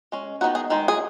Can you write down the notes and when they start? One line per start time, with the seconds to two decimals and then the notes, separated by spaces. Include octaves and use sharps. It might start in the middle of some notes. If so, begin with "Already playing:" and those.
0.12 G#3 C#4
0.41 D#3 G#3 B3 D#4 F#4
0.55 G#4
0.70 D#3 G#3 D#4
0.88 G#4